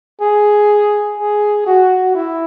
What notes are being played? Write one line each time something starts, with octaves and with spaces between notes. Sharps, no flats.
G#4
G#4
F#4
E4